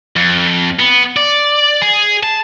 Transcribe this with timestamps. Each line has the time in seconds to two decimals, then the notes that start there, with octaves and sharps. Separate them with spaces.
0.16 F2
0.79 B3
1.16 D5
1.82 G#4
2.23 A5